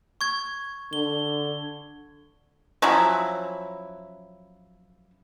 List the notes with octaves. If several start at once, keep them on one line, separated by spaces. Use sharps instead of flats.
C#6 G#6
D3 G7
F3 F#3 C#4 E4